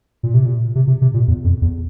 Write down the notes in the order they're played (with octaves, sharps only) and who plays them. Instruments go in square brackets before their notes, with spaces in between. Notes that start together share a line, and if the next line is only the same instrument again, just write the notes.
[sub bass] A#2
C3
A#2
C3
C3
C3
A#2
E2
F2
E2